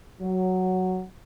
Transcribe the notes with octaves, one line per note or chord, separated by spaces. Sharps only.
F#3